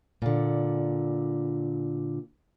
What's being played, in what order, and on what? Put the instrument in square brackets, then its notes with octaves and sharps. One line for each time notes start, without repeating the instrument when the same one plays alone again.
[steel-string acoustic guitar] A#2 D3